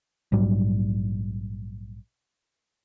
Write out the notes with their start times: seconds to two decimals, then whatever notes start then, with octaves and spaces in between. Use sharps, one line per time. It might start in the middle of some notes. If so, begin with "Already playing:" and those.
0.32 A#1 G#2 F#3 G3